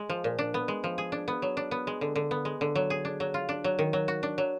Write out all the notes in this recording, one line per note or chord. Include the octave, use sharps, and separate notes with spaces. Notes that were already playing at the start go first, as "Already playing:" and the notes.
Already playing: G#3
F3
A#2
D4
B3
G#3
F3
G#4
D4
B3
F#3
D4
B3
G#3
D3
D3
B3
G#3
D3
F#3
G#4
D4
F#3
F4
D4
F#3
D#3
F#3
F#4
D4
F#3